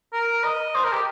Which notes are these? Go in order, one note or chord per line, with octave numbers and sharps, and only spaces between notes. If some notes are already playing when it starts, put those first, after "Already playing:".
A#4
D#5
C5
A#4
G4